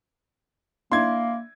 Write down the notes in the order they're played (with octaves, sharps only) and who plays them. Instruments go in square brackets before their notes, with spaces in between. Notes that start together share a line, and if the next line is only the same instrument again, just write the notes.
[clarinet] A#3 [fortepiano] D4 E4 [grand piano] C6 G#6